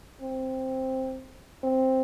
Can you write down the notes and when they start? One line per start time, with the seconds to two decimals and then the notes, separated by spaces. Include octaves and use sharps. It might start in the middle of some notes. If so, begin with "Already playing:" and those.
0.22 C4
1.63 C4